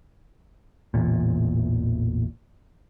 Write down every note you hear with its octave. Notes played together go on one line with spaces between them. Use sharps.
A1 E2 A#2